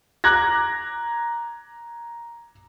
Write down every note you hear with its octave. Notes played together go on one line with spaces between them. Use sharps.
A#5 D6 F#6 G#6 A#6